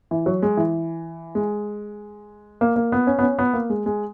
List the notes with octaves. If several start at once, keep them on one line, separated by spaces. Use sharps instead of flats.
E3
F#3
G#3
E3
G#3
A#3
A#3
B3
C#4
B3
C#4
B3
A#3
G#3
G#3